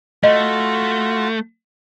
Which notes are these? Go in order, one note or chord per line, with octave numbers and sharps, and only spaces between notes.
A3 F4 F#4 D#5